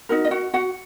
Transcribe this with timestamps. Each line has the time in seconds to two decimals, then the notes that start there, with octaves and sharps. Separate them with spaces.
0.09 D#4 F#4 A#4
0.25 D#5
0.31 F#4 F#5
0.54 F#4 F#5